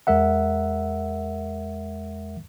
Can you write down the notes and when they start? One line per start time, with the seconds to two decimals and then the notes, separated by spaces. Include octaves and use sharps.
0.07 E2 G#3 A#4 E5 F#5